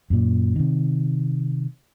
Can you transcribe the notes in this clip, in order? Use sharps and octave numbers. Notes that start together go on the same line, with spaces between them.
F#2 A#2
C3 D#3